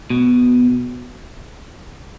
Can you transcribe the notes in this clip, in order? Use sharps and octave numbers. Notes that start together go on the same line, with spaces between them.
B2